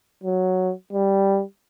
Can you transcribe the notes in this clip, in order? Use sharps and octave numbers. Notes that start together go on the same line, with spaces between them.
F#3
G3